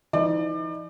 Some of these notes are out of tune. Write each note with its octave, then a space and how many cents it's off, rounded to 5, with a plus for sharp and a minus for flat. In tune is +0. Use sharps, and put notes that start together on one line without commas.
F3 -45 D#4 +30 D5 +30